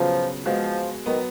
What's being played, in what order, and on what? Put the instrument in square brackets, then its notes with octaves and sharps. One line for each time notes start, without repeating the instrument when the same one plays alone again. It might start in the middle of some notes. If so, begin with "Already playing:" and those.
Already playing: [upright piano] C#3 F#3 B3 F4 [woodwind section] F3
[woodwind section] F3 [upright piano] G#3 B3 F#4
[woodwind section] D#3 [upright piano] F#3 B3